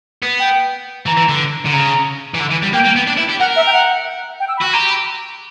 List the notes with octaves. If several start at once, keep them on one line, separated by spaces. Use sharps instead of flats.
B3
G5
E3 A#5
E3
D3
D3
C#3 A#5
E3
D3
E3
G3
A#3 G5
A#3
B3
D4
E4
G4
A#4 F#5
E5
G5
F#5
G5
E6
B5
F#4
G4 A#5
B5